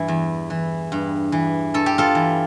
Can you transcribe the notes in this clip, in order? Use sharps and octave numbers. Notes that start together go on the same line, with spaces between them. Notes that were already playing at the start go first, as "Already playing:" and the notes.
Already playing: G2 E3 E4
E2
E3
G2
E3
G2 A4
G4
F4 A4
E3